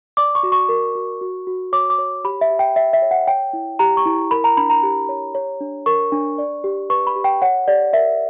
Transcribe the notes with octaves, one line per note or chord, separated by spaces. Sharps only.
D5 D6
C#6
F#4
C#6
A#4
F#4
F#4
F#4
C#5 D6
D6
C#5
G4 B5
E5
G4
G5
C#5 E5
E5
C#5
F#5
C#5 G5
E4
G4 A#5
C#6
E4
A#4 B5
A#5
D4 B5
A#5
G4
C#5
C#5
D4
A#4 C#6
D4
D5
G4
B4 C#6
B5
G4
G5
C#5 F#5
G4 D5
A#4 E5